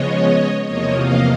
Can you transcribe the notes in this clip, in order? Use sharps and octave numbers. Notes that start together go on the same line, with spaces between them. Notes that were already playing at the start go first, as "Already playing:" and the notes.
Already playing: C#3 F3 G#3 B3 C#5 D#5
E2 C3 F3 A#3 C#5 D#5
D#5 F5